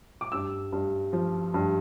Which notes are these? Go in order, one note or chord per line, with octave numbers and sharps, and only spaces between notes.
D6
G2 E6
G2
F3
G2